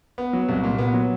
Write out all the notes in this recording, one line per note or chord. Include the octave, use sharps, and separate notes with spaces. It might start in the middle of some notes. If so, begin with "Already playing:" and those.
B3
F#3
C2
A#2
B3
F#3